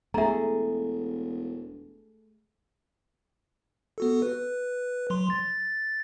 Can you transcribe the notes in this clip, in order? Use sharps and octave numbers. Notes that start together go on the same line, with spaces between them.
E1 A3 G#4 E5 A#5
B3 F#4 A4
B4
F#3 C6
A6